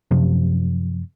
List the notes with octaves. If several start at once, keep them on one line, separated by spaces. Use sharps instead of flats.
F#2 C3 F3